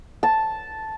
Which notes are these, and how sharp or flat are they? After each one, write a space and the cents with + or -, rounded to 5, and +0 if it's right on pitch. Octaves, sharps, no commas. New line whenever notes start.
A5 -5